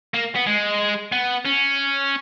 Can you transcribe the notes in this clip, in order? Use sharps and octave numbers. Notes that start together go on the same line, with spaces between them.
A#3
B3
G#3
B3
C#4